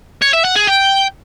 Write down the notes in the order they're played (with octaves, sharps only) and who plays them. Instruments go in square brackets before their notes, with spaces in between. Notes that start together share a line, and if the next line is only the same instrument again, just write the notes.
[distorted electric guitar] C#5
E5
F#5
G#4
G5